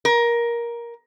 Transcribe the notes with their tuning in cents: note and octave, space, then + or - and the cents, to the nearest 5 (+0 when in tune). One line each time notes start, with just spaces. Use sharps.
A#4 +15